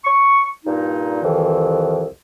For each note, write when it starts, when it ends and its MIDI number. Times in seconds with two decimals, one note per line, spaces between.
0.04 0.45 85
0.65 1.20 43
0.65 1.20 46
0.65 1.20 63
1.23 2.04 36
1.23 2.04 41
1.23 2.04 51
1.23 2.04 52